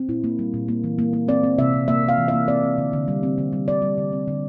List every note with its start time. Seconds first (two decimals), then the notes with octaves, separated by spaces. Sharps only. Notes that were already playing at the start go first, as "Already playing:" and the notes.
Already playing: C4
0.09 A#2 E4
0.24 A#3
0.39 G3
0.54 A#2
0.68 A#3
0.84 E3
0.99 A#3
1.13 A#3
1.28 C4 D5
1.44 C4
1.58 C3 E5
1.73 C4
1.88 A#3 E5
2.04 A#3 F5
2.18 E3
2.28 A#3 E5
2.48 C4 D5
2.63 C4
2.78 D3
2.93 D3
3.08 G3
3.23 C4
3.38 D3
3.53 G3
3.68 D3 D5
3.82 G3
3.98 D3
4.13 C4
4.28 D3